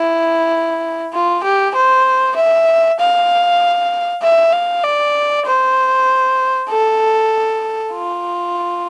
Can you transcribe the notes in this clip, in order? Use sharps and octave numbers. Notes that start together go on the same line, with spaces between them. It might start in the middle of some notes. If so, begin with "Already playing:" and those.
Already playing: E4
F4
G4
C5
E5
F5
E5
F5
D5
C5
A4
F4